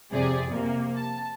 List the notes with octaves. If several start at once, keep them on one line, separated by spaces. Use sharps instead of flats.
F2 C3 G4 G#4 D5
C3 A#3
A5